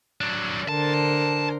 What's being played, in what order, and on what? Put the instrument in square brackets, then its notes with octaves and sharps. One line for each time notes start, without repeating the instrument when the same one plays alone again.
[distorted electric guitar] F#3 D4
[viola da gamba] D3 A#4 C5 [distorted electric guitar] A5